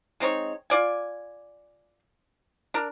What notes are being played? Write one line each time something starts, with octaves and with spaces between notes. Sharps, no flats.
G#3 C4 D#4 C#5
F4 D5 G#5
D4 A#4